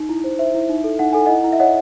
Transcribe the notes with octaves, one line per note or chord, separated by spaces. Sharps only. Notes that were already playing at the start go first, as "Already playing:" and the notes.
Already playing: D#4
E4
C5
C5 E5
E4
D#4
A4
D#4 F#5
A4 G#5
E4 D#5 F#5
E4
E5
C#5 D#5 F#5